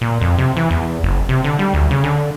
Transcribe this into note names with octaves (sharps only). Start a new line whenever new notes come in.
A#2
F2
C3
E3
E2
F#1
C3
D3
G3
D2
C#3
D3